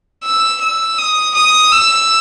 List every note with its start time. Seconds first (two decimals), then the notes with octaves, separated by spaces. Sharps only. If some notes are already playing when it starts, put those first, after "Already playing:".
0.24 E6
0.61 E6
0.98 D#6
1.35 D#6
1.72 E6